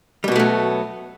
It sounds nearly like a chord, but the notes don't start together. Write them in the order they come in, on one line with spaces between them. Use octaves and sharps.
G3 B2 B3 A3 F#3